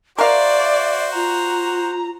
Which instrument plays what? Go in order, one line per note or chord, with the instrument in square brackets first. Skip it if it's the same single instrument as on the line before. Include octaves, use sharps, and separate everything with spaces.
[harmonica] F#4 C5 [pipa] A#4 F5 [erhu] D5 [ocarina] E5
[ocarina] F4 [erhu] A#5